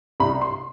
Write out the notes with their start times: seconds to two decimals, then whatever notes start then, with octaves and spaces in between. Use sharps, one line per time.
0.20 C2 B5
0.41 C6